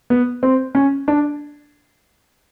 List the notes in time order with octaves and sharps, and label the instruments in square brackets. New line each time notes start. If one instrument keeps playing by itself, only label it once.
[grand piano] B3
C4
C#4
D4